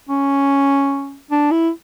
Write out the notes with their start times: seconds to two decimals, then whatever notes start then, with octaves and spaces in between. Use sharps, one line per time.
0.09 C#4
1.31 D4
1.51 E4